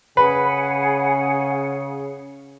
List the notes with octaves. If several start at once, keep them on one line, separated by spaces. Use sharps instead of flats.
C#3 G#4 B4 F#5 G#5